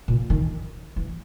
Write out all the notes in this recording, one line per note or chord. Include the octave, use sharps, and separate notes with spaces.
A#2
D#3
E3